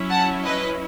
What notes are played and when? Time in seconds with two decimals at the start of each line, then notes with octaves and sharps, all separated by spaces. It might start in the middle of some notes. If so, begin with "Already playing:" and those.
Already playing: F#3 C#4 E4
0.10 F#5 A5
0.43 B4 D#5